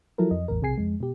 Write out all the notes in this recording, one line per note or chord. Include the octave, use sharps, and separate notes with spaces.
F3 F#3 E4 A4 A#4
F2 D#5
A1 E2 A2 A#4
B1 C3 G#4 G#5 C7
F2 G#3
B2 G4